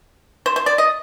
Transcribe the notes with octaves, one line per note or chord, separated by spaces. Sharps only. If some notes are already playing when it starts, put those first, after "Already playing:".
C5
C5
D5
D#5